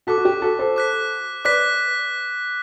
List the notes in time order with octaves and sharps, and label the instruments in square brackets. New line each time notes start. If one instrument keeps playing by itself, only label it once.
[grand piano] F#4 A4 [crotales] D6 F#6 B6
[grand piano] F#4
G4
F#4 A4
A4 C5
[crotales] D6 F#6 B6
[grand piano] B4 D5 [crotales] D6 F#6 B6